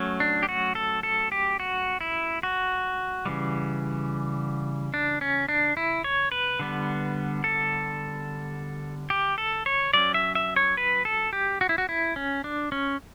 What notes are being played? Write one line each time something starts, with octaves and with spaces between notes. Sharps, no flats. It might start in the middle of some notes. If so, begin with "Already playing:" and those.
Already playing: F#3 A3 C#4
D4
G4
F#4
A4
A4
G4
F#4
E4
F#4
C#3 E3 G3
D4
C#4
D4
E4
C#5
B4
D3 G3 B3
A4
G4
A4
C#5
F#3 C#4 D5
E5
E5
C#5
B4
A4
G4
F#4
E4
F#4
E4
C#4
D4
C#4